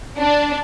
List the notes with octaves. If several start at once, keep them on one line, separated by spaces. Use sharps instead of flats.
D4